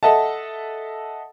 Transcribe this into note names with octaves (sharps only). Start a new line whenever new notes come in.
A4 D#5 E5 F#5 A5